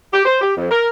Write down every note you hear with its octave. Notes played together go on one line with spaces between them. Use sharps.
G4
C5
G4
F2
A#4